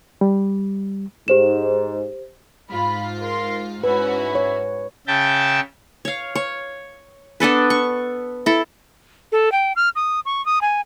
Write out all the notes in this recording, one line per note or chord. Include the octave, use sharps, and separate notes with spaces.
G3
G#2 G4 C5 E7
G#2 F4 B5
A#4 C6
G#2 C#4 E4 F#4 B4 E5
C#5
C#3 E5 G5 A5
C#5 F5
C#5
B3 D4 A4 B4
C#6
E4 A4
A4
G5
F6
D#6
C#6
D#6
G#5